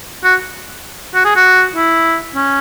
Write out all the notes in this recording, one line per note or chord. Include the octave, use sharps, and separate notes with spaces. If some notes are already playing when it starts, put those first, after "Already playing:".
F#4
F#4
G#4
F#4
E4
C#4